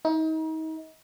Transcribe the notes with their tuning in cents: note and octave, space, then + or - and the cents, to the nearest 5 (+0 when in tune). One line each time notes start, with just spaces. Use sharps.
D#4 +35